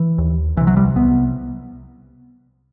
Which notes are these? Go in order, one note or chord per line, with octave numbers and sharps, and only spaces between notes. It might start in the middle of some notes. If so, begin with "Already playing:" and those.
Already playing: E3
D#2
C2 C3 E3
F#3
G3
C2 C3 B3